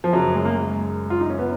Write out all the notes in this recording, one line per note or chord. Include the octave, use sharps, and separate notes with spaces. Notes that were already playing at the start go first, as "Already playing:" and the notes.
F3
F#2 C#3 F#3
G#3
A#3
G#3
F4
D#4
C#4
B3